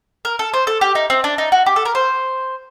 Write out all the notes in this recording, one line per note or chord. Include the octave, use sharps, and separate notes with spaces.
A#4
A4
C5
A4
G4
D#4
C4
D4
D#4
F#4
G4
A4
A#4
C5